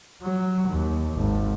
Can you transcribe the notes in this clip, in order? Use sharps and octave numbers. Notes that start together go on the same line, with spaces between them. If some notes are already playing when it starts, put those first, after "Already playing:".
F#3
D#2
G#1